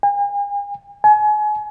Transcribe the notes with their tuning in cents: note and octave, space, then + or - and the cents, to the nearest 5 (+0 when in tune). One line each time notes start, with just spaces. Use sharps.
G#5 -45
G#5 +30